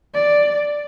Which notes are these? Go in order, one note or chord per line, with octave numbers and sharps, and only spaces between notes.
D5